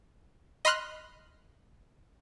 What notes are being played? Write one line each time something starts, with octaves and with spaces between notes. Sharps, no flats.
D#5 B5 C6 F6 F#6